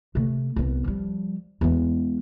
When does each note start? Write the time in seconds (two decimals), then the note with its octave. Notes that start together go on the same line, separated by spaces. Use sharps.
0.15 C3 A3
0.56 C2 B3
0.84 F3 G3
1.61 E2 G#3